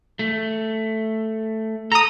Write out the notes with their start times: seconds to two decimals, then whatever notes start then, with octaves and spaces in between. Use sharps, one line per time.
0.19 A3
1.92 A4 A#5 D#6